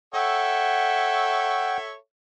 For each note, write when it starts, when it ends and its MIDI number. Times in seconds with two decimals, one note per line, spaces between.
0.14 1.95 69
0.14 1.95 73
0.14 1.95 76
0.14 1.77 78
0.14 1.77 79